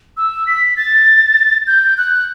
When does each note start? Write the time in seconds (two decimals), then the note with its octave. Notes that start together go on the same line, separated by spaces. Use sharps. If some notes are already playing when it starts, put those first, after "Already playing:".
0.17 E6
0.47 B6
0.77 A6
1.67 G6
1.98 F#6